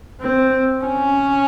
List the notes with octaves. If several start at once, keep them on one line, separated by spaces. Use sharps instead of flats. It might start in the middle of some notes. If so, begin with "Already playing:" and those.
C4
C#4